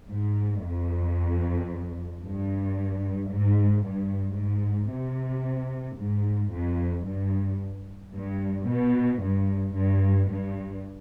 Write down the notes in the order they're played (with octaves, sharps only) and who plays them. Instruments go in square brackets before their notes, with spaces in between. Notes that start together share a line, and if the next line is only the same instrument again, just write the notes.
[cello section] G#2
F2
G2
G#2
G2
G#2
C3
G#2
F2
G2
G2
B2
G2
G2
G2